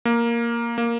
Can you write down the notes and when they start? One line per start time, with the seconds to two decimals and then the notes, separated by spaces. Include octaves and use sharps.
0.05 A#3
0.78 A#3